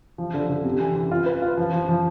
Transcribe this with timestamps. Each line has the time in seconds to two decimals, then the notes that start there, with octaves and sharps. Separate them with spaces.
0.18 F3
0.34 D3
0.49 D3
0.65 C3
0.80 E3
0.96 E3
1.11 F4
1.26 B4
1.42 F4
1.57 F3
1.73 F3
1.89 F3